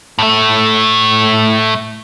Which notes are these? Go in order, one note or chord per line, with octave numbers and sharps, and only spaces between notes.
A2 A3